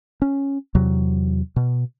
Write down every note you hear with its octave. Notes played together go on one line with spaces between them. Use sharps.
C#4
E2 C3 F#3
B2